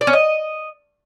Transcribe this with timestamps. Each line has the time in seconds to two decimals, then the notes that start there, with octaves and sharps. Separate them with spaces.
0.01 D5
0.07 C#4
0.13 D#5